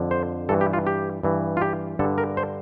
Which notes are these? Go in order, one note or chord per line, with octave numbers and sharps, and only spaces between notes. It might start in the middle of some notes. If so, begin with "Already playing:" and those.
Already playing: F2 D3
C5
G2 E3 A4
G4
F4
G4
G2 E3
F4
G4
G2 D3 A4
A#4
C5